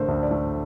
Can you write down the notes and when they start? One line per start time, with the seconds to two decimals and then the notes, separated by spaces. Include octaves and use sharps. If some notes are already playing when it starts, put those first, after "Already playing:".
Already playing: A1 D3 A3 A#4 C5
0.08 D2
0.23 D5
0.31 A3